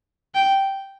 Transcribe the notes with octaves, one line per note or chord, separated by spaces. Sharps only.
G5